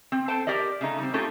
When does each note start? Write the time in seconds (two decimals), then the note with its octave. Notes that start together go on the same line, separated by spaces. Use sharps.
0.12 C4
0.28 A4 C5 G5 A5
0.47 G4 A#4 D5 D#5
0.81 C#3 A3 D#4
0.98 G3 C4
1.13 A3 C#4 D#4 F4 G4 A4